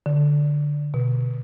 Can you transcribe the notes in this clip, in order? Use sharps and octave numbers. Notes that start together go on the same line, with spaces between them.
D3
B2